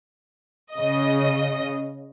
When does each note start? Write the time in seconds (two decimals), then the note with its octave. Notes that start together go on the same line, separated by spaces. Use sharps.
0.74 C#3 D#5